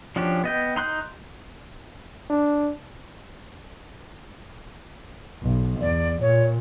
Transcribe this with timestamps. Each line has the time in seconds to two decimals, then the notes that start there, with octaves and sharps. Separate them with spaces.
0.16 F3 C#4 D4 F#4 G4
0.44 B3 D#5 G5
0.76 D#4 C6 F#6 G6
2.30 D4
5.42 B1
5.81 E2 D5
6.21 A#2 C#5